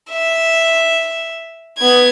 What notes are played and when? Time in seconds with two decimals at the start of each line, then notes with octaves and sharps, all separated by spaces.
0.11 E5
1.78 B3 G#6